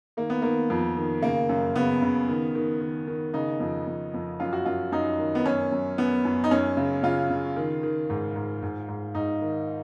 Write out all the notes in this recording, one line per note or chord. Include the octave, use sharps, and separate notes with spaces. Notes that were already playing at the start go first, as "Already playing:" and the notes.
D#3 A#3
B3
D#3 A#3
F2
D#3
C#3 A#3
F#2
C#3 B3
C#3
D#3
D#3
D#3
D#3
C#3 D#4
F2
F2
F2
F#2 F4
F#4
F#2 F4
F#2 D#4
D#3
B3
F#2 C#4
F#2
F#2 B3
F#2
D#4
F#2 C#4
C#3
C#3 F4
C#3
D#3
D#3
G#2
G#2
G#2
G#2
G#2 D#4
D#3